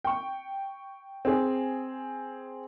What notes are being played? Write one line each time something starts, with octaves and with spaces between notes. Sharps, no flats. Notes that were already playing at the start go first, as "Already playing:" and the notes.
G5 C#6
C4 G#4